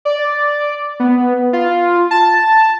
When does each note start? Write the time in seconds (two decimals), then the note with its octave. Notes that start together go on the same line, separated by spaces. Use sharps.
0.05 D5
1.00 B3
1.53 F4
2.11 A5